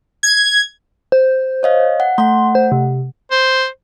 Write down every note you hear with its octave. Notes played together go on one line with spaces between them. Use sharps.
G#6
C5
C#5 D#5 F5
F#5
A3 F#5 C6
C5
C3
C5